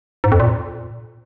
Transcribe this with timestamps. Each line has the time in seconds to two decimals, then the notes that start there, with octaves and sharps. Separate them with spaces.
0.24 G#2
0.32 F2
0.40 A#2